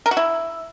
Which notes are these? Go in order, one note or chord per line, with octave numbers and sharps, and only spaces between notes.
A#4
F#4
E4